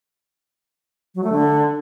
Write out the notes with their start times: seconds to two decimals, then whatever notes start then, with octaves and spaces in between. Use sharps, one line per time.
1.15 F#3
1.24 A3
1.32 D3